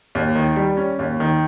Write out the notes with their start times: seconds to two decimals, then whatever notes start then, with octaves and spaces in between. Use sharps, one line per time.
0.15 D#2
0.35 D#3
0.56 G3
0.77 C#4
0.99 D#2
1.20 D#3